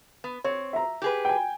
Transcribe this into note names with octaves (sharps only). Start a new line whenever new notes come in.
B3
C4 C#5
E5 A#5
G4 G#4 B4
G5 G#5